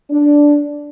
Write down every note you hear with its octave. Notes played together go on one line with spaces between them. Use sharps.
D4